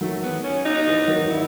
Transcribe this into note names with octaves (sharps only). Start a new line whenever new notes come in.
D#3 F#3 A3
B3
C#4
D#4
E3
D#3 F#3
E4